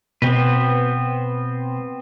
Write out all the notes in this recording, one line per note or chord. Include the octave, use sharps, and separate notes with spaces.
B2 B3 C4 B4